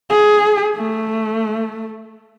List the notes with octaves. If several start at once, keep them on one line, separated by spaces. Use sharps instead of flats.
G#4
A3